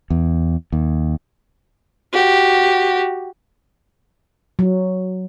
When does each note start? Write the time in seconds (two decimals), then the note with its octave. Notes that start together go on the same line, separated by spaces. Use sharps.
0.10 E2
0.72 D#2
2.13 F#4 G4
4.59 F#3